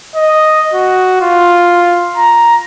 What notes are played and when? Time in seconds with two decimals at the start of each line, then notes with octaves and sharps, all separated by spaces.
0.16 D#5
0.74 F#4
1.21 F4
2.17 A#5